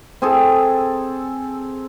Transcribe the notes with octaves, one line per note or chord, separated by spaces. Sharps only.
C4 G#4 A4